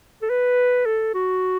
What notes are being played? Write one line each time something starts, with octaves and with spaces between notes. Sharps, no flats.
A4
B4
A4
F#4